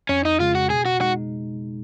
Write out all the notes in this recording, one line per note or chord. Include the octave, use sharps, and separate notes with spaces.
F2 C#4
D#4
C#3 G#3 F4
F#4
B2 G#4
F#4
G#3 D#4 F#4